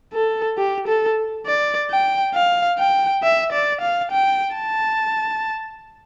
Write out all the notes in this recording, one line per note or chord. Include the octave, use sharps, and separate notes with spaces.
A4
G4
A4
D5
G5
F5
G5
E5
D5
F5
G5
A5